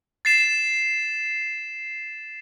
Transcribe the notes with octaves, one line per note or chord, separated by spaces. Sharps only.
A6 C7 E7